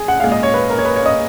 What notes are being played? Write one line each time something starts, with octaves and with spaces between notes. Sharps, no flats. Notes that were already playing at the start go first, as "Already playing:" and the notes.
Already playing: G#4
F#5
A#2 G#3 F5
D#5
C#5
B4
A#4
C#5
B4
C#5
D#5